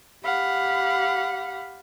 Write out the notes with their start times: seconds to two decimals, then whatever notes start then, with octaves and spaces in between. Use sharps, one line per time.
0.24 G4 F5 F#5 B5